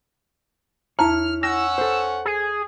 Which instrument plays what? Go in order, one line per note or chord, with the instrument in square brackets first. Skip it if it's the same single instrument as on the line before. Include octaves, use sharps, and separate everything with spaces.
[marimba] E2 A5 A#5 [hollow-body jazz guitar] E4 C#5 [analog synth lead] F6
[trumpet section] C#4 F#5 [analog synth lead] E6 [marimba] A#6
[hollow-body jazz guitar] A4 C5
[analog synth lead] G#4